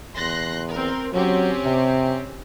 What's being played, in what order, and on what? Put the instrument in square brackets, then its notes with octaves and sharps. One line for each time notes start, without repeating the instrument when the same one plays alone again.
[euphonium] E2 [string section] C6 F#6 A#6
[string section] C4 A#4
[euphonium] F#3 [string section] C4 C#4 G4
[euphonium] C3